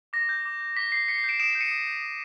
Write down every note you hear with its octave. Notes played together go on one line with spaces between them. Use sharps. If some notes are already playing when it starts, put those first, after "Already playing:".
D6 A#6
G6
D6
G6
D6 B6
G6 C7
D6 B6 C#7
C7
G6 D7 E7
D#6 D7 E7
D7 E7
G6
C#7 D#7
D#6
G6
D#6